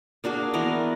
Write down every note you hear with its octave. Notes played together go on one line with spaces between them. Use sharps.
A#3 D4 F#4 G#4
E3 B3 A#4